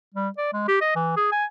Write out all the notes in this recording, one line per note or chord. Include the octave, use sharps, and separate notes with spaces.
G3
D5
G#3
G4
D#5
E3
G#4
G#5